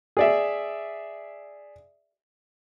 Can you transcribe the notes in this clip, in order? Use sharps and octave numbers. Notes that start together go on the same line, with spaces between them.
G#4 D5 E5